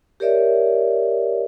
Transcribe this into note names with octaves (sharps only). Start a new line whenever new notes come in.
G4 A#4 C#5 D5 E5